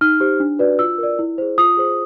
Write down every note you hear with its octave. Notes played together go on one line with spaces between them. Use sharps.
D#4 F6
G4 C5
D4
F#4 B4 D5
F4 E6
A#4 D5
E4
G#4 C5
F4 D#6
G#4 C5